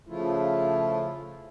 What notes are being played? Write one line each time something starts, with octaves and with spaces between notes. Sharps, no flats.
C#3 F3 A3 E4 F4